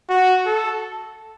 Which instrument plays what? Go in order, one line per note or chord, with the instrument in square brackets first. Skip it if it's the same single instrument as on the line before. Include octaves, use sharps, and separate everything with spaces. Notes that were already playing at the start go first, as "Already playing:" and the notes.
[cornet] F#4
A4